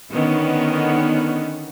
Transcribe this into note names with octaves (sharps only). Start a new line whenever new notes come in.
D3 D#3 B3 C#4